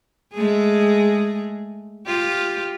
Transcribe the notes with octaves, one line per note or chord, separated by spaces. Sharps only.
G#3 A3 G#4
F4 G4